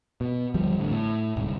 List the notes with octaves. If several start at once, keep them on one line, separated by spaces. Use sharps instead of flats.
B2
G1 D#2 F3 G3
A1 D3
A2
D1 C2 G#2